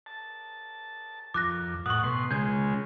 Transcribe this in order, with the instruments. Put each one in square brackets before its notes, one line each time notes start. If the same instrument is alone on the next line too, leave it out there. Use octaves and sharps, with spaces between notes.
[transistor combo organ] A5
[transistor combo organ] F2 [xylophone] D6 F#6 A#6
[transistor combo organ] A2 F#5 [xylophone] C#6 D#6
[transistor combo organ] B2 C6
[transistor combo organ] C#3 G#3 [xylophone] G6 G#6